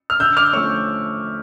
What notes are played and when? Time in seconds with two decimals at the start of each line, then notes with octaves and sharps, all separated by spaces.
0.10 F6
0.19 D3 E6 G6
0.37 D6 F6
0.53 F3 A3 C#4 C#6 E6